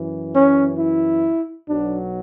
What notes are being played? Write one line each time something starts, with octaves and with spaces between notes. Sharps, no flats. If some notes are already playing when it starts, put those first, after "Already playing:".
Already playing: F#2 E3
C#4
E4
B1 B2 F#3 D4